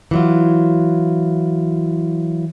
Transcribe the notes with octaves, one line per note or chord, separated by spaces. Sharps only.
E3 F#3 F4